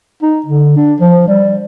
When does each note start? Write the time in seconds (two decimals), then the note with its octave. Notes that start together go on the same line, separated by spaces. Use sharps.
0.22 D#4
0.46 D3
0.77 D4
1.00 F3
1.28 G3